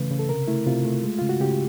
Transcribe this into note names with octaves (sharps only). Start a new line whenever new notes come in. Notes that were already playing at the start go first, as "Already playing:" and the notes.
Already playing: C#3 E3 A3 B4
C#3
A4
C3 A#4
A3 E4
C3 F4
A3
G#3
C#3 F4
F#4
C#3 G4